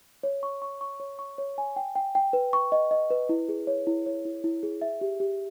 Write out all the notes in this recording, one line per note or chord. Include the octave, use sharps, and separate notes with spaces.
C#5
C#6
C#6
C#6
C#5
C#6
C#5
G#5
G5
G5
G5
B4
C#6
D#5
D#5
B4
E4
G#4
C#5
E4
C#5
E4
E4
G#4
E5
G4
G4